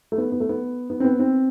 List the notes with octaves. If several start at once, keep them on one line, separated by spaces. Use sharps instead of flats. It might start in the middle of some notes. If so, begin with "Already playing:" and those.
A3
B3
B3
A3
B3
B3
C4
B3
C4